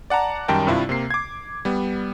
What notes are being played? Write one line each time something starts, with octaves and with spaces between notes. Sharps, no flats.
D5 F#5 A5 A#5
F#2 D#3 G3 A#4 G5 A5
G2 C3 E4 F4
C3 A#3 C7
D6 G#6
G3 B3